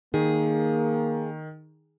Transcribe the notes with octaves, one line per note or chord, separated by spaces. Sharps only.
D#3 A#3 G#4